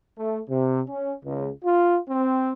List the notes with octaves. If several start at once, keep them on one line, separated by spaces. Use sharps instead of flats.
A3
C3
C#4
C#2
F4
C4